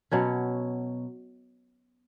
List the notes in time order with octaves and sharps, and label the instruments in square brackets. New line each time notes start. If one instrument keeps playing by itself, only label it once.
[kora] B2 F#3 C#4